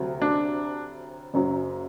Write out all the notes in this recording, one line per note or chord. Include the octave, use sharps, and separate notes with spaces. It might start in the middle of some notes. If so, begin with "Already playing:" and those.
Already playing: D2 C3 F#3
D4
F#1 F#2 F#3